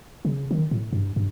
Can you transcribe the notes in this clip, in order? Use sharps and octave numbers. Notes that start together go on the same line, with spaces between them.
C#3
D#3
A2
G2
G2